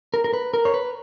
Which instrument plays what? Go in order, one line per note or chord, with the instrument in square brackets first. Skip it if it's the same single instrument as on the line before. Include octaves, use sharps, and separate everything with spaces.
[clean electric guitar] A#4
A#4
B4
A#4
C#5
B4